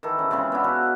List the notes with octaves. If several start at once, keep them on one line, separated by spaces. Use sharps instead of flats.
D#3 E3 A4
C#4 G#4
C#3 G#3 C4 C#4
B3 D4 E4
F#4 A4 B4 F5